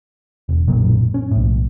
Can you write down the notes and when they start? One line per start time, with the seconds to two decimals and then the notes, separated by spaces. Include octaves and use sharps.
0.49 E1
0.68 B1 F#2 A#2
1.14 C#4
1.31 B1 A2